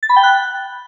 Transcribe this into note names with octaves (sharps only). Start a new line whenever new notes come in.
A6
B5
G5
F#6